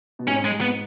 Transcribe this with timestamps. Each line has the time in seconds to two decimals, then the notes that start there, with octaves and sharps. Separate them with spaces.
0.19 B2
0.28 G#2 C#4
0.45 G#3
0.61 B3